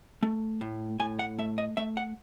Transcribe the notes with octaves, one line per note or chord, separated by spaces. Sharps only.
A3
A2
A2 G#5
F#5
A3 E5
D#5
A3 E5
F#5